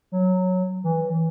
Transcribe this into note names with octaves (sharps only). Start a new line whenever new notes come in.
F#3
E3